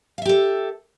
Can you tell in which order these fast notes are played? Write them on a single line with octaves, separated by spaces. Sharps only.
F5 E5 G4 A4